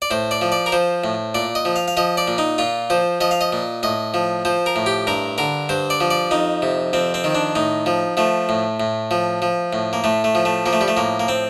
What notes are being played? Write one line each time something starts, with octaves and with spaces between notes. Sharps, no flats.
D5
A2 C5
D5
F3
D5
A#4
F3 C5
A2
A#2 D5
D#5
F3
F5
F5
F3 D#5
D5
A#2
D#4
A#2 F4
F3 C5
F3 D#5
F5
D#5
A#2
A2 D#5
F3
F3 C5
A#4
A2
G4
G2 A#4
D3 A#4
G2 C5
D5
F3
D5
F2 D#4
C3
F2 C4
C4
D#3
D4
A2 D#4
F3
F3 A3
A2
A2
F3
F3
A2
A#3
A2 A3
A3
F3
A3
F3 A#3
A3
G3
A3
A2 A#3
A#3
C4